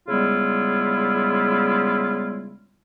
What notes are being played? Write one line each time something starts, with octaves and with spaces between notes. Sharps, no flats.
C#3 G3 G#3 B3 E4 F4